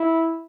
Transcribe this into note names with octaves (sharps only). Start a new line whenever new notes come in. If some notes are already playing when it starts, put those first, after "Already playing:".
Already playing: E4